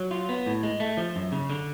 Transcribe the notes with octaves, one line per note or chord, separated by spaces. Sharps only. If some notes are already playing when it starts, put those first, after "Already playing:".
Already playing: F#3
F4
B3
A2
G#3
A3
F3
F#2
C#3
D3